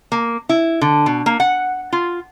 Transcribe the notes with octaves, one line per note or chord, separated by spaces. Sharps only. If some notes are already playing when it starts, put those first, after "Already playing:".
A#3
E4
D3
B2
A#3
F#5
F4